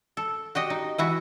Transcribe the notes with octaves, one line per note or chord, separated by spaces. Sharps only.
A4
F#4 G4 D#5
D#4
E3 E4 F#4